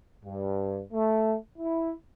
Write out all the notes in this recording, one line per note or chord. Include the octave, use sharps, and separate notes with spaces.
G2
A3
E4